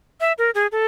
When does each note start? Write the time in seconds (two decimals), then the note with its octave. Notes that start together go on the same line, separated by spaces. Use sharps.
0.20 E5
0.38 A#4
0.55 G#4
0.72 A4